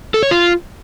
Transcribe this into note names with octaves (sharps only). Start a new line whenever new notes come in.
A4
C#5
F4